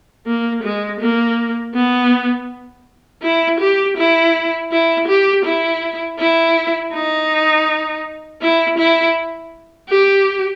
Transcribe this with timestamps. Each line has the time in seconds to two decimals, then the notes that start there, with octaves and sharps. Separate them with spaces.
0.26 A#3
0.63 G#3
1.00 A#3
1.74 B3
3.22 E4
3.60 G4
3.97 E4
4.71 E4
5.08 G4
5.45 E4
6.19 E4
6.93 D#4
8.41 E4
8.78 E4
9.89 G4